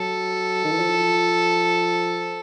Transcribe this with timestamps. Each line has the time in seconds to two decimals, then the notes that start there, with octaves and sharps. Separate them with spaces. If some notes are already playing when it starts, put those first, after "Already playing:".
Already playing: F#3 A4
0.64 D#3
0.72 E3
0.79 F3